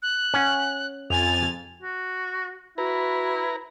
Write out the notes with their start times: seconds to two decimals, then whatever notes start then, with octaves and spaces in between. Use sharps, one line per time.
0.02 F#6
0.34 C#4 F#5
1.10 F2 G#5 A6 F7
1.82 F#4
2.78 E4 F#4 B4 A#5